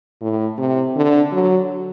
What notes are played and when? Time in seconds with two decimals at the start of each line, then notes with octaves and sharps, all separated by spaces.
0.21 A2
0.58 C3
0.96 D3
1.32 F#3